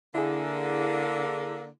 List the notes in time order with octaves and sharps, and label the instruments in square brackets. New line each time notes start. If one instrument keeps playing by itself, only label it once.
[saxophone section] D3 A#3 [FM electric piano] E4 G#4